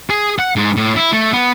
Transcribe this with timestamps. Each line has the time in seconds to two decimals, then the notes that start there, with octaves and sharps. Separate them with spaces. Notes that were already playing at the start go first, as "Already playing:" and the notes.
0.10 G#4
0.39 F#5
0.56 G#2
0.77 A2
0.96 E4
1.12 A3
1.33 B3